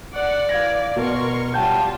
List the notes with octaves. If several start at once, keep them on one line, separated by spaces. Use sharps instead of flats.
D5 F#5
E3 F5 G#6 A#6
B2 A#4 C6 C#6
F#3 G3 F4 F#5 G5 A5 G6